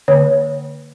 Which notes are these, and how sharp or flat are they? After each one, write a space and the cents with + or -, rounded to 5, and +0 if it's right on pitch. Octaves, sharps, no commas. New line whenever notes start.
D3 -5 A#3 -30 C#5 +0